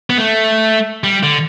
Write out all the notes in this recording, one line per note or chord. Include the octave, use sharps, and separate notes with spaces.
B3
A3
G3
D3